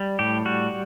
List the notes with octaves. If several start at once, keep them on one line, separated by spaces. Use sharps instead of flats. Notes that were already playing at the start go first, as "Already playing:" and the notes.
Already playing: G3
A2 G4
G3 F#4